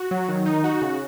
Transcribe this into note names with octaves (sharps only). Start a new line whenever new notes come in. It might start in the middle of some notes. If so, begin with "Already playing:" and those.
Already playing: F#4
F#3
D#3
D#4
F#4
C#3